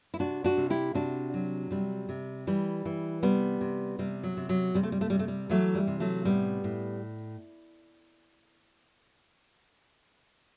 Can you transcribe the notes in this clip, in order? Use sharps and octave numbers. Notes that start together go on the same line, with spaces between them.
E4
C3 D4 F#4
D4 F#4
C3
E4 G4
C3 D4 F#4
F#3
C3 G3
C3
E3 G3
E3
C3 G3 B3
C3
C3 G3
F#3
C3
F#3
C3 G3
A3
G3
A3
C3 G3
A3
G3
E3 F#3 A3
G3
C3
F#3 A3
A2 G3 B3
A2